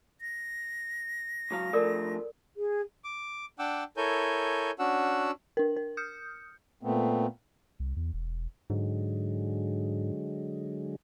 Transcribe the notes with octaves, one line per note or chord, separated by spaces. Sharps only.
A#6
C#2 F#3 F5
G2 F3 A3 A4 A#4 D5
G#4
D6
D4 F#5 G5 D6 E6
E4 A4 A#4 C#5 G#5 G6
C#4 D4 F#4 F#5 E6
D4 A#4
A#4
D#6 F6 G6 C#7
A#2 A3 B3 C4
C2
E2
E1
G#2 D3 F#3 G#3